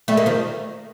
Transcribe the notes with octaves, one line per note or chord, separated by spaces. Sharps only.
G3 A3
G#3 A#3
D#3 F3